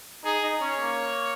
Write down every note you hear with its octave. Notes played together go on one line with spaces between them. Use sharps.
D#4 G#4
D#4
C#4 C#5
A#3